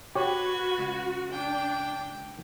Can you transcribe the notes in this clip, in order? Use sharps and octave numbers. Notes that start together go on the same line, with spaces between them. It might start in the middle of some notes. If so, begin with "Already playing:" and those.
F#4 G4 B4 C#5 G#6
C#2
D4 G5